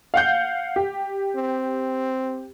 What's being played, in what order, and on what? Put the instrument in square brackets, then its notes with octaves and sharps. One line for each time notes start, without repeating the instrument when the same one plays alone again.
[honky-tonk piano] F5 F#5 G6
G4
[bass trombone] C4